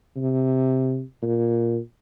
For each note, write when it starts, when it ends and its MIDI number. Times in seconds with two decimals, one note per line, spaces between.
0.16 1.02 48
1.22 1.78 46